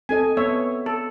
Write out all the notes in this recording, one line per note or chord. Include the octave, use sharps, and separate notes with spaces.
C4 A4 D#5 G#5
B3 C#5 E5
A4